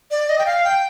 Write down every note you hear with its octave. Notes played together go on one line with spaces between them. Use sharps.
D5
D#5
G5
F5
G5